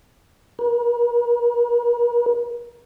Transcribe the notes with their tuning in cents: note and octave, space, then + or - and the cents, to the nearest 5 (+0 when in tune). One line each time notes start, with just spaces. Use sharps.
A#4 +40